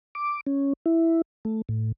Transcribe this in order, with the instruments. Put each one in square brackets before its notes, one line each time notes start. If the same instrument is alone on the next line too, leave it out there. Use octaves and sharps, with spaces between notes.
[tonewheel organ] D6
C#4
E4
A3
A2